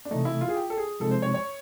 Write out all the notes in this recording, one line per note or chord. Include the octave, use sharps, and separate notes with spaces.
D4
C3 E3 A3 D#4
E4
F4
G#4
G4
A4
G#4
C3 F3 G#3 C4 D#4 A4
C5
C#5
C#5